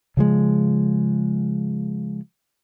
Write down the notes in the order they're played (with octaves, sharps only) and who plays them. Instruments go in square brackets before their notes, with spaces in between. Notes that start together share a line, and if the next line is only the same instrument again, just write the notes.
[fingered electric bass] C#3 F3 G#3